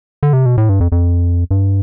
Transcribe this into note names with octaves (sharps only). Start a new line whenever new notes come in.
D3
C3
B2
A2
G2
F2
F2
G2